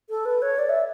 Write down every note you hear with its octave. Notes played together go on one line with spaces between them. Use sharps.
A4
B4
C#5
D5
E5